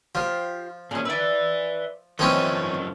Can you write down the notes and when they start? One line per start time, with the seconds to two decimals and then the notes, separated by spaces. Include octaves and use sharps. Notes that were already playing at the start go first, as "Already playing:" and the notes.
0.15 F3 F4 G4 C5
0.91 A#2 A#3 C#4 G#4 D#5
1.05 B4 D5 E5 E6
2.19 F#2 E3 F3 A3 C4 C#4 C#5 D#5